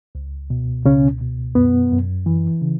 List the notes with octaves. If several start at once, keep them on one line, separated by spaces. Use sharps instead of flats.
C#2
B2
C#2 C#3 C#4
B2
F#2 B3
F#2
E3
C#3